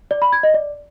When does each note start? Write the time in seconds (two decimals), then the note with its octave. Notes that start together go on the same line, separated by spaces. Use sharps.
0.11 D5
0.22 B5
0.32 G#6
0.43 D#5
0.54 D5